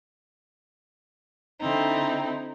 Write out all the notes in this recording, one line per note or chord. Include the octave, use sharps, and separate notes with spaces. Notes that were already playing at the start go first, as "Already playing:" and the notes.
D3 C4 D#4 E4